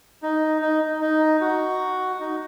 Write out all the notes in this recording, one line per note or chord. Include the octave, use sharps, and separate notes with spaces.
D#4
D#4
D#4
F#4
D#4